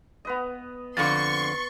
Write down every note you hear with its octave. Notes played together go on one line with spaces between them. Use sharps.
B3 B4 D#5
F2 D3 C6 C#6 A6